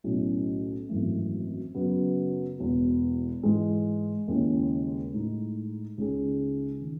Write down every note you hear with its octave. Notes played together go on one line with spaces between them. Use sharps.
B1 A2 F#3 C#4 E4
G#1 F#2 E3 A3
F#2 C#3 F#3 B3
E1 E2 B2
G#2 E3 G#3
D#2 C#3 G#3 C#4 E4
A2 G#3 D#4
C#2 C#3 G#3 D#4 G#4
D#3